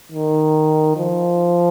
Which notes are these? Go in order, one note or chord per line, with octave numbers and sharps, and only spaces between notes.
D#3
F3